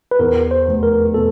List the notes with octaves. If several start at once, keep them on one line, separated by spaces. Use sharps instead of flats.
B4
E2 A#4
C5
F1
A#4
B2 A4